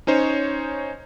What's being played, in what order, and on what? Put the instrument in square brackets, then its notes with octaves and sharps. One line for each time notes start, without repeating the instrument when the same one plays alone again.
[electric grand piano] C#4 D#4 C5 C#5